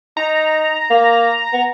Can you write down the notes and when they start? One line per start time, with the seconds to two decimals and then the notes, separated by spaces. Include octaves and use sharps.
0.17 D#4 A#5
0.90 A#3
1.53 B3